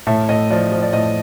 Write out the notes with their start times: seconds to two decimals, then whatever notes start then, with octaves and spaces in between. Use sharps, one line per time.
0.07 A2 E5
0.28 A2 D#5
0.51 F3 D5
0.72 F3
0.82 D5
0.93 A2 D#5